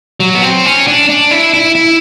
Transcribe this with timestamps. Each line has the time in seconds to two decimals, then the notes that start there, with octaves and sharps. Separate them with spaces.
0.20 F#3
0.35 B3
0.43 C4
0.66 C#4
0.87 D4
1.09 D4
1.31 E4
1.54 E4
1.75 E4